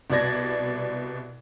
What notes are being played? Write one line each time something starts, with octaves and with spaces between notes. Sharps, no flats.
C2 B2 D5 G#6 A#6